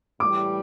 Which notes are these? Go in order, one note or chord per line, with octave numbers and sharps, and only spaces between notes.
A2 E3 G3 D6